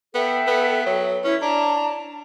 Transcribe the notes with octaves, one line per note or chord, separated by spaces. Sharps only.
B3 A4 E5 G5
B3
F#3
C#4 E4
D4 A5 A#5